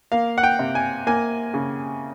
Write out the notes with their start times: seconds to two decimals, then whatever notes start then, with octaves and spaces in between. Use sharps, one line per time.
0.12 A#3 F5
0.38 F#5
0.43 G5
0.59 C3
0.75 G#5
1.07 A#3 G#5
1.54 C#3